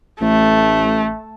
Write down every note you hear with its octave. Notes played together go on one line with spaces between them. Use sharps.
A1 A3